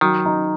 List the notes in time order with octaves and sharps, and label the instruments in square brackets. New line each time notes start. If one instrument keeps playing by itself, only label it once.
[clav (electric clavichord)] D#3 [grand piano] F#3
[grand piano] D#4